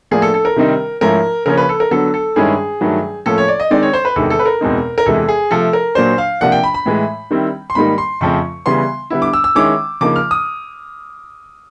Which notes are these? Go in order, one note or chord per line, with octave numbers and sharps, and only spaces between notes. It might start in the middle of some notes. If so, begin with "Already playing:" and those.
A2 F3 A#3 D4 G#4
A4
A4
A#4
C3 D#3 G3 C4 D#4
G#2 F3 A3 C#4 E4 A#4
C#3 F3 A#3 C#4 A#4
B4
A4
A#4
D3 F#3 B3 A4
A4
G2 D#3 G#3 C#4 E4 G#4
G2 D#3 F#3 A3
A2 F3 A#3 C#4 A4
C#5
D5
D#5
D#3 G#3 C4 D#4 D5
C#5
C5
B4
E2 C3 D#3 G#3 A4
A4
B4
A#4
E2 B2 G#3 C4 D#4
A#4
E2 C3 E3 G#3 A4
G#4
C3 F3 A3 A4
A#4
A#2 F#3 A#3 D4 C5
F5
C3 F3 A#3 D4 F#5
G5
B5
B5
A2 E3 G#3
D#3 G3 C4 E4
C6
G#2 D#3 G3 A#3 D#4 B5
C6
F2 C#3 F3 A3 C4 C#6
C#3 E3 G3 B3 C6
D3 G3 B3 E4
D6
E6
E6
D#3 G#3 C#4 E4 D6
C#3 F3 A#3 D#4 D6
F6
D#6